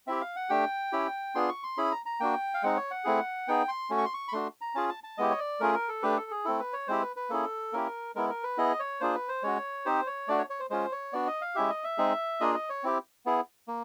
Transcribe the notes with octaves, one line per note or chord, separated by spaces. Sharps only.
C4 E4 G4 E5
F5
F#5
A3 D4 G4 G5
C#4 E4 G4
B3 D4 F4 G#4 C6
C#6
C6
C#4 E4 G#4 B5
A#5
A#5
A#3 D4 F#4 G5
F5
G#3 C4 D#4 F#5
C#5
F#5
A3 C4 E4 G#4
B3 D#4 G#4 G5
C6
A3 C#4 F#4
C#6
C6
C#6
B5
A3 D4 F#4 C6
A#5
C#4 F4 G#4 A5
A5
A5
G#3 B3 E4 G4 D#5
C#5
D5
A3 C#4 F4 G#4 A#4
A#4
A4
A3 D4 G4 B4
A4
G#4
A3 C4 E4 A4
B4
C#5
G#3 C4 E4 G4 C5
B4
B4
A#3 C#4 E4 G#4 A4
A#3 C#4 E4 G4 A#4
G#3 B3 E4 A#4
A#4
B4
B3 E4 G#4 D#5
C#5
A#3 D4 F4 G#4 C5
B4
C5
G#3 C#4 F#4 C#5
C4 D#4 G4 C5
C#5
A3 D4 F#4 D5
C#5
C#5
C5
G#3 C#4 F4 C5
C#5
B3 D4 F#4 D5
D#5
F5
G#3 C#4 E4 G4 E5
D#5
E5
G#3 C4 D#4 G#4
A#3 D4 F4 G#4 D#5
D#5
C#5
C4 E4 G4
B3 E4 G#4
A#3